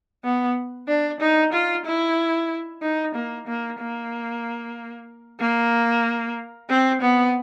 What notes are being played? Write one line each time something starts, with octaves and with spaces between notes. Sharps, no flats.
B3
D4
D#4
F4
E4
D#4
A#3
A#3
A#3
A#3
C4
B3